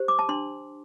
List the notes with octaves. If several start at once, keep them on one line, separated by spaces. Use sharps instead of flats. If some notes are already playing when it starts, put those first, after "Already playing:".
Already playing: G4 C5
D6
A5
D4 C6